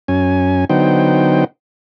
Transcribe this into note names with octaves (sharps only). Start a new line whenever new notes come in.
F#2 C#4 G#5
D3 F#3 B3 D#4 C5 G5